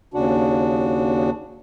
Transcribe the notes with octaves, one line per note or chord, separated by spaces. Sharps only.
D#2 C#3 D4 F#4